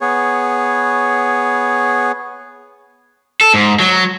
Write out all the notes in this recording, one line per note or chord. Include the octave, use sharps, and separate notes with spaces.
B3 G#4 C#5
A4
G#2
F#3